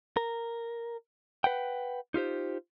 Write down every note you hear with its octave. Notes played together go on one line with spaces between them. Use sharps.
A#4
B4 F#5 G5
D#4 F4 G4 C5